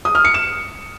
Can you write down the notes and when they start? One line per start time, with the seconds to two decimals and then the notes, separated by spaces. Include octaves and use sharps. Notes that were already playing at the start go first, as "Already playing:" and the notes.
0.05 D#6
0.15 F6
0.25 C#7
0.34 E7